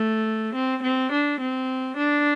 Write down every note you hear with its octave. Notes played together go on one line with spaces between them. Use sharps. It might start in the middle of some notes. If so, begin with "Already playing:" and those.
Already playing: A3
C4
C4
D4
C4
D4